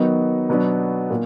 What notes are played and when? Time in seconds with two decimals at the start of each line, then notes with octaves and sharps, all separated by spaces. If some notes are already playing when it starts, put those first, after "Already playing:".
Already playing: D#3 F#3 B3 D#4
0.49 B2 F#3 B3 D4
1.10 A#2